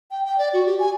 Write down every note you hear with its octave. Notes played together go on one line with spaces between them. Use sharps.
G5
G5
D5
F#4
G4
G#5